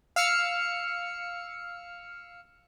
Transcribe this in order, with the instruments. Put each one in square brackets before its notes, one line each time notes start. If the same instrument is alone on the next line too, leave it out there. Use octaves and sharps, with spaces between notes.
[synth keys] F5 E6 F6 C#7